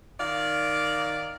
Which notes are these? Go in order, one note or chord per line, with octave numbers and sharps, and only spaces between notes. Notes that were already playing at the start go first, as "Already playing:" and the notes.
D#3 D5 F5